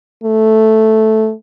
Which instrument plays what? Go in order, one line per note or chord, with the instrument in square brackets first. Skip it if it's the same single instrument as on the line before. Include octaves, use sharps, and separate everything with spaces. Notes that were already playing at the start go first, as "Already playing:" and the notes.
[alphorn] A3